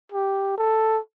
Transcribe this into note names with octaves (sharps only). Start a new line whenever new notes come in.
G4
A4